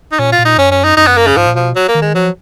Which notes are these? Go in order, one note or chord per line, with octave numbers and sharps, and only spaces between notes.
D#4
A#2 C#4
F4
A#2
D#4
F#2 C#4
C#4
D#4
F#2 D#4
B3
A#3
C#3
G#2 F3
A#2
B2 F3
F#3
A#3
D#3
G#3
F3 F#3